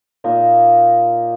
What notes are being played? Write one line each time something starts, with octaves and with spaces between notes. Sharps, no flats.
A#2 A#3 D#4